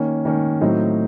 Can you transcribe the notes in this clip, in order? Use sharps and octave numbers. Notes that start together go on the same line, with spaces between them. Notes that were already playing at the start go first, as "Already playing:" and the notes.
Already playing: D#3 A#3 C#4
D#3 A#3 C#4
A2 F#3 C4 D#4